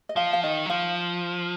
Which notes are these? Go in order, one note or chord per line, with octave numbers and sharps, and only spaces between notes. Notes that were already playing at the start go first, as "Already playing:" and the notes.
D#5
F3 F5
F5
D#3 D#5
F#3
F3 F5